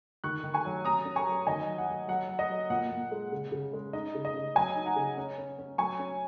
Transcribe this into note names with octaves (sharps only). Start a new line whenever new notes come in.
D#3 C#6 F#6
D#3
G#5 C#6
F#3
C#4 A#5 D#6
C#4
G#5 C#6
F#3
D#3 D#5 G#5
F#3
F#5
F#3
F#3 F#5
F#3
D#5
F#3
A#2 F#5
A#2
G#3
C#3
C#3
G#3
D#4 D#5
C#3
D#5
C#3
F#3 D#5 G#5
D#4
F#5 A#5
C#3
C#4
C#4
C#4
F#3 G#5 C#6
C#4